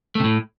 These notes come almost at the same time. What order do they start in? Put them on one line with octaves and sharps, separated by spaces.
A3 C3 A2